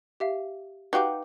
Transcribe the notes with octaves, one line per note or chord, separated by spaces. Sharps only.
G4 E5 F5
D#4 F#4 G4 B4 F5 D6